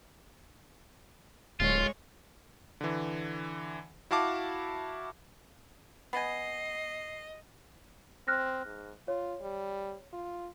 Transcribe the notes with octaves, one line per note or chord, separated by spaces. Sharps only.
D1 G#3 F4 C#5
D3 E3
E4 F#4 F5 A5 D6
B3 D#5 G#5 C7
C4 F6 F#6 A#6
G#2
F4 C#5
G3
F4